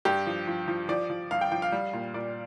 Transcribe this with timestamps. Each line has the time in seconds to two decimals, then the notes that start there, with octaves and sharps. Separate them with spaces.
0.05 G2 G4
0.27 F3
0.47 F3
0.68 F3
0.89 F3 D5
1.10 F3
1.31 G2 F5
1.41 G5
1.52 F3 G5
1.62 F5
1.72 G3
1.93 A#2
2.14 A#2 D5